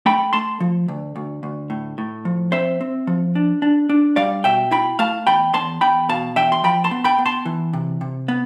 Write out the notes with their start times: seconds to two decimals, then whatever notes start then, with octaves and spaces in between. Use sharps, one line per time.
0.06 A3 G5 B5
0.33 A3 A5 C6
0.60 F3
0.88 D2
1.16 D2
1.43 D2
1.70 A2
1.98 A2
2.25 F3
2.52 C4 C5 E5
2.81 C4
3.07 F3
3.35 D4
3.62 D4
3.89 D4
4.16 G3 D5 F5
4.44 B2 E5 G5
4.71 E4 G5 B5
4.99 A3 F5 A5
5.27 E2 G5 B5
5.54 E2 A5 C6
5.81 E2 G5 B5
6.09 B2 F5 A5
6.36 E2 E5 G5
6.52 C6
6.63 F3 G5 B5
6.84 A5 C6
6.91 B3
7.04 G5 B5
7.19 B3
7.26 A5 C6
7.45 E3
7.73 C3
8.01 C3
8.28 B3